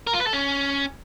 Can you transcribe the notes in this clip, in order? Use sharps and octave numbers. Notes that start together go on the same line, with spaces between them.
A#4
F4
B4
A4
C#4